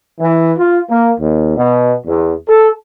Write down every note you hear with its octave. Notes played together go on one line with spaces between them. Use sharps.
E3
F4
A#3
D#2
B2
E2
A4